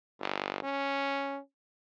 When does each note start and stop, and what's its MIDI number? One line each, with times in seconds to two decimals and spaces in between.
0.20 0.59 31
0.63 1.39 61